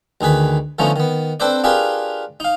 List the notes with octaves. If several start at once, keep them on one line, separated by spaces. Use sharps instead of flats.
D2 D#3 G#4 B4 B5
D3 F3 A3 B3 C#4 D#4
D#3 B3
C4 D4 A4 B4 C5 D5
D4 F4 G4 G#4 A#4 B4
D#4 F5